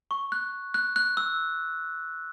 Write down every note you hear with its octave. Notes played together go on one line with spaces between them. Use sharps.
C#6
F#6
F#6
F#6
E6